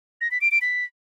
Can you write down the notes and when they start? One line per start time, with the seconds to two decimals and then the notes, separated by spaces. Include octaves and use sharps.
0.21 A#6
0.31 B6
0.41 D7
0.51 D7
0.61 B6